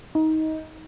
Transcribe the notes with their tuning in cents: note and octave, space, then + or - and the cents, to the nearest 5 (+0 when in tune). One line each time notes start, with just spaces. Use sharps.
D#4 +20